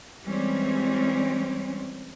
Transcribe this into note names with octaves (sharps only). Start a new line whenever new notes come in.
E3 G3 G#3 C4 C#4